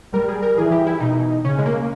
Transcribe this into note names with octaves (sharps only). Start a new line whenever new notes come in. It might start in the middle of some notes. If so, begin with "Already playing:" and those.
G3 A#4
G#4
A#4
E3 G#4
G4
E4
B2 D#4
C#3 C#4
G#3
A#3